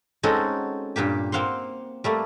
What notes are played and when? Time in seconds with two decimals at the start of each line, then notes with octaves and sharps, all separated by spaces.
0.23 G#3 C4 C#4 D#4 F#4 A4
0.96 G2 A#2 A#3 G4
1.32 A#3 C4 F5 F#5 C6
2.04 G3 A3 A#3